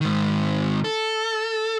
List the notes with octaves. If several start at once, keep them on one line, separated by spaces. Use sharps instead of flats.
G#2 D#3
A4